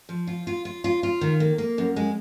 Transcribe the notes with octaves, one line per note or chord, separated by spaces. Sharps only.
F3
F4
F4
F4
F4
F4
D#3
A#3
A#3
F#2
G#3